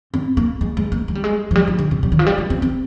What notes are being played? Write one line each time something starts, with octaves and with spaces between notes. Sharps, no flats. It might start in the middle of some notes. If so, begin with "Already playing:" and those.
C4
A#3
G#3
G#3
A#3
G#3
G3
G#3
F3
G3
F3
D3
C3
G3
D#3
F3
G3
G#3
C4
C4